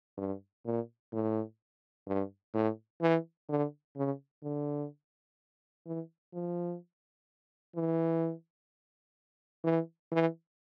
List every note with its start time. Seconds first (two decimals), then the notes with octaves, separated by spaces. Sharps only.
0.18 G2
0.66 A#2
1.13 A2
2.07 G2
2.54 A2
3.02 E3
3.49 D3
3.96 C#3
4.43 D3
5.86 E3
6.33 F3
7.75 E3
9.64 E3
10.12 E3